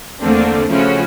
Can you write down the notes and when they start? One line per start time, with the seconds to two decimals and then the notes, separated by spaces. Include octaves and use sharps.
0.21 E2 D3 A3 A#3 C4 D4
0.68 C#3 F3 A3 C#4 E4 F#4